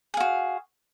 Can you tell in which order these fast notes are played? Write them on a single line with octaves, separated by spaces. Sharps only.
G#4 F5 F#4